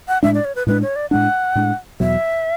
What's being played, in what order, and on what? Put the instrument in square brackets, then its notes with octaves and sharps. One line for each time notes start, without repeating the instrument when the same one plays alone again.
[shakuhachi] F#5
[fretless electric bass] A2 G#3 D4 [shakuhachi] E5
[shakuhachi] D5
C#5
B4
[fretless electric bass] A2 G#3 D4 [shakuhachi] B4
[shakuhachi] C#5
D5
[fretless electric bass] A2 G#3 D4 [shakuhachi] F#5
[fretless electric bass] A2 G#3 D4
[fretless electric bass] E2 B2 F#3 [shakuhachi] E5